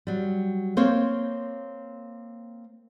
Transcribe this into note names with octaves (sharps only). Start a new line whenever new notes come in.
F#3 G3
A#3 C4 C5 C#5